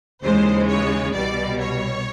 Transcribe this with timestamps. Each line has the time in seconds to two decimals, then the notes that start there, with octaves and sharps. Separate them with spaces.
0.23 D#2 C#3 E3 G#3 C5
0.68 C#5
1.14 C2 B2 G3 D5
1.60 C#5